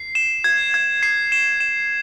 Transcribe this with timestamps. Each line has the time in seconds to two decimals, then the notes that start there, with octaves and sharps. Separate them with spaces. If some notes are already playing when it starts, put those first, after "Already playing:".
Already playing: C7
0.15 E7
0.44 G#6
0.74 G#6
1.03 C7
1.32 E7
1.60 E7